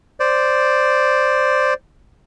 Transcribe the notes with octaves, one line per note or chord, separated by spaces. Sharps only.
C5 D5